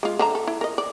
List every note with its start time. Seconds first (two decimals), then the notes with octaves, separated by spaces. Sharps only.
0.03 G#3 F4
0.19 D3 E5 A#5
0.35 A4
0.47 E4
0.61 A#4 D#5
0.78 D5